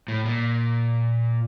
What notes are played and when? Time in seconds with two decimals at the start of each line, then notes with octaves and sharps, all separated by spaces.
0.08 A2
0.25 A#2